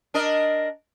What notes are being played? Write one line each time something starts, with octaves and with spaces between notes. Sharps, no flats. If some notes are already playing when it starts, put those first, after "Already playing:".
D4 A#4 D#5